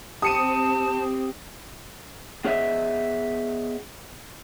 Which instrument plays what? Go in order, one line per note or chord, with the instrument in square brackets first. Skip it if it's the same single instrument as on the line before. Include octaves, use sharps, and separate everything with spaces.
[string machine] C4 [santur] G4 [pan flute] A5 [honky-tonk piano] D#6 C#7 D#7
[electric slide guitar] B3 G#4 C#5 D#5 E5